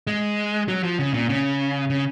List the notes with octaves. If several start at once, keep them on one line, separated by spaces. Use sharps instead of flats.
G#3
F#3
F3
C#3
A#2
C#3
C#3